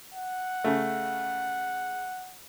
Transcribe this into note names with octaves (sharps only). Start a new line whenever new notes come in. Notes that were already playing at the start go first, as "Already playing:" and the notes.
F#5
C#3 A3